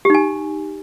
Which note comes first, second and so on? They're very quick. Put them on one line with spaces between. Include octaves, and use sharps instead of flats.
G4 D#4 G#5